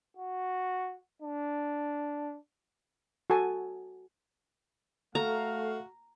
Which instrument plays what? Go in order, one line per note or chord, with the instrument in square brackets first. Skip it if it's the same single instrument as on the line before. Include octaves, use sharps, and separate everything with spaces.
[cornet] F#4
D4
[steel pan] F#4 A4 G#5 A5
[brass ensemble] A3 F5 [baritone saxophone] F#4 [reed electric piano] A4 [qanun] A#5